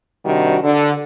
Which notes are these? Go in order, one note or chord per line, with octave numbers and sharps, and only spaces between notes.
C3 D#3 G3 D4 F#4
D3